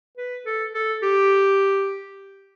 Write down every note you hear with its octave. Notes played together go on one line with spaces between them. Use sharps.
B4
A4
A4
G4